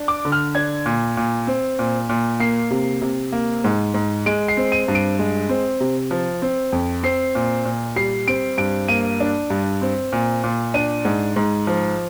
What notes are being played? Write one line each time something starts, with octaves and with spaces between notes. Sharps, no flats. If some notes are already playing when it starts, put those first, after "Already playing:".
Already playing: D4
D6
D3
F6
D4 G#6
A#2
A#2
C4
A#2
A#2
A#3 C7
C3
C3
A#3
G#2
G#2
G#3 D7
C7
C4
D#7
G2
D7
G#3
C4
C3
F3
C4
F2
C4 C7
A#2
A#2
G3 C7
C4 D7
G2 D7
A#3 D#7
D4
G2
C4
A#2
A#2
D4 D#7
G#2
G#2
F3